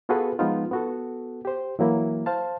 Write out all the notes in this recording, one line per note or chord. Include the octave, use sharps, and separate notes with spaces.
B3 F4 F#4 G#4 A4 B4
F3 G#3 B3 D#4 F4
B3 F#4 A4
G4 C5
E3 F#3 A#3 E4
C5 F5 A5